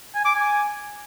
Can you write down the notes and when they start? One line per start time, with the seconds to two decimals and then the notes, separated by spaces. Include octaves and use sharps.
0.15 G#5
0.25 D6
0.35 G#5